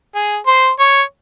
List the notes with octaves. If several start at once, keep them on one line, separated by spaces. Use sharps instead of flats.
G#4
C5
C#5